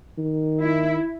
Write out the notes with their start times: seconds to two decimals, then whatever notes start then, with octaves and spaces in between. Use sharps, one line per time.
0.18 D#3
0.62 E4